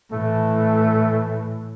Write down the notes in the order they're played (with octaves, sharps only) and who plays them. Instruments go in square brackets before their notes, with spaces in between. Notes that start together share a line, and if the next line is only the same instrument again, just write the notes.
[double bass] A2 E3 [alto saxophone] A3